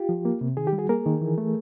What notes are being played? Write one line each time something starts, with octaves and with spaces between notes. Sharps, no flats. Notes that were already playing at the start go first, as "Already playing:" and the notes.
Already playing: F4 G4
F3
A#3
C3
D#3 G#4
G4
G3
F#4 G#4
A#3 G#4 A#4
D#3
E3
A3